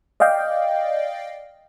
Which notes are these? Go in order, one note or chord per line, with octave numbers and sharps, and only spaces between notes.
D5 D#5 F5 G5